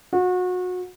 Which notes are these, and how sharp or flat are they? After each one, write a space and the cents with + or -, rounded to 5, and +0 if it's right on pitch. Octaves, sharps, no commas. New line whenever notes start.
F#4 -30